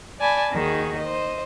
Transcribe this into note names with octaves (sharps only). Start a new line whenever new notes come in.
D5 G#5 A5 B5
D#2 D#3 D#4 F#4 G#4
C5 D#5